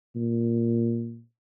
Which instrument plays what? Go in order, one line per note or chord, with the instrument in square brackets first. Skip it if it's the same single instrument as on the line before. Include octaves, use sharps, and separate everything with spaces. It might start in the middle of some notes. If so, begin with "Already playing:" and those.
[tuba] A#2